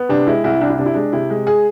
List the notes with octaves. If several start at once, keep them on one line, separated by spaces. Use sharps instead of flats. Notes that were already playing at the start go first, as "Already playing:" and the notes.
Already playing: B3
C3 D4
G#3 E4
C2 E4
C2 D4
E4
C3 D4
E4
G#3 D4
C3 E4
G#3
G#4